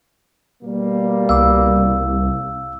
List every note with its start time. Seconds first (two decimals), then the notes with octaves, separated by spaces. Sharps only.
0.63 B2 G3 A#3
1.29 C2 F5 D6 E6